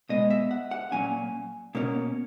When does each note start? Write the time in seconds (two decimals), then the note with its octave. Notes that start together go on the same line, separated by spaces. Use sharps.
0.09 B2 G#3 B3 D#5
0.31 E5
0.51 F#5
0.71 F#5
0.92 A#2 F#3 A#3 C#4 G#5
1.75 B2 A#3 C#4